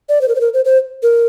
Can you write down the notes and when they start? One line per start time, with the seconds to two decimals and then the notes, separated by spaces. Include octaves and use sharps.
0.09 D5
0.21 C5
0.28 A#4
0.35 C5
0.41 A#4
0.54 C5
0.65 C5
1.03 A#4